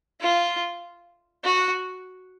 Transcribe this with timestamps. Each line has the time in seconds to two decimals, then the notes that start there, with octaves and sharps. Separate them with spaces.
0.21 F4
1.44 F#4